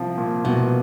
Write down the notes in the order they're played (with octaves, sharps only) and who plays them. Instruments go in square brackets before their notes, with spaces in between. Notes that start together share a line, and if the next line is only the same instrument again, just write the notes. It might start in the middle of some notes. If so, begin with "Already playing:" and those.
Already playing: [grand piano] C2 F3
A#2
[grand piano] C2 [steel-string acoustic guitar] B2